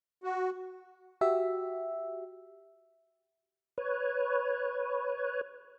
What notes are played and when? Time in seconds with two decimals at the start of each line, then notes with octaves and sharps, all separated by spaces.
0.24 F#4
1.21 F#4 G4 E5
3.78 B4 C#5